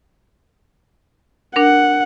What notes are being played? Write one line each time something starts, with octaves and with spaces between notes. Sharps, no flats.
D4 A#4 F#5